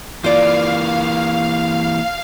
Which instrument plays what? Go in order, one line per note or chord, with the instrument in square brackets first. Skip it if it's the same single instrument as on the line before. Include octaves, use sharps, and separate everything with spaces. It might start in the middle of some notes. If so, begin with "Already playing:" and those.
[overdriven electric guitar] E3 A#3 [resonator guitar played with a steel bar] F4 D5 [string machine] F5